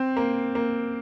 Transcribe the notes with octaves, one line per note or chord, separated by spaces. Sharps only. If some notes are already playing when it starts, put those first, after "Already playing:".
Already playing: C4
A#3
A#3